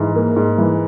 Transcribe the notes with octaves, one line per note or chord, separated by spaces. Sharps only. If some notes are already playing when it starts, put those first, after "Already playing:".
Already playing: G#2 E3
A#3
G#2
E3